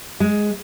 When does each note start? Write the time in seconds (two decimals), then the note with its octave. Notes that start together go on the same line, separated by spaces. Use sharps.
0.20 G#3